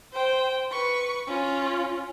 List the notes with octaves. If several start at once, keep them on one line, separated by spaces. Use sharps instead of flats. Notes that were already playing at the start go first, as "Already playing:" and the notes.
C5 G5
B4 C#6
C#4 F4